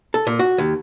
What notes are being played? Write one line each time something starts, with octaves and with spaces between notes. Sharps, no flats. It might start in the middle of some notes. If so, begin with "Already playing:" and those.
A4
A#2
F#4
D#2